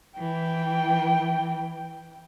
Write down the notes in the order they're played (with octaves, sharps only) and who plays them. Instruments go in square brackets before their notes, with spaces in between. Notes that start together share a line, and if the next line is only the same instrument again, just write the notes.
[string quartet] E3 [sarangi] G5